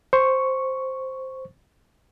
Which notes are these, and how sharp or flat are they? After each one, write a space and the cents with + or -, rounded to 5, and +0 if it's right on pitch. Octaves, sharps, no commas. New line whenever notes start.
C5 +0 C#6 +0